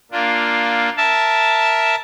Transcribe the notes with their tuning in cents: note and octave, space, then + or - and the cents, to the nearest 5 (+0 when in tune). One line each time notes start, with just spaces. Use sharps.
A#3 +0 D4 +0 F4 +0
A#4 +0 E5 +0 A5 +0